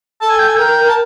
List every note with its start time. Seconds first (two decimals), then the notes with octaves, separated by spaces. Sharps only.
0.21 A4 A5
0.30 G#5
0.39 G5
0.48 G#5
0.57 A#4 G5
0.84 A#4
0.89 A5